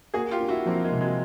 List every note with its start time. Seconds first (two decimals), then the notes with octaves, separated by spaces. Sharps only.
0.14 A#3 F#4 G#4
0.31 F4 G4
0.40 D4
0.48 E4 F#4
0.65 F3 A#3 C4
0.84 G#3 A#3
0.92 C3
1.01 F#3 G#3